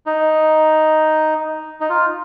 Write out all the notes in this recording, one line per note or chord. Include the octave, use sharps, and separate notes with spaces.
D#4
D#4
F4